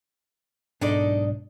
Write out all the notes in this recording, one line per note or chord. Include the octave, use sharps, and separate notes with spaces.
B1 G#2 D4 D#4 A4 D5